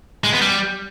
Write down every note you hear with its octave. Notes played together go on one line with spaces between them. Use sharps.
G#3
B3
G3